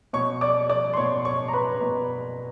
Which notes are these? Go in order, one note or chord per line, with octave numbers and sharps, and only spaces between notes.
B2 C#5 C#6
D5 D6
D5 D6
C6
B2 C#5 C#6
C#5 C#6
A#5
B4 B5
B2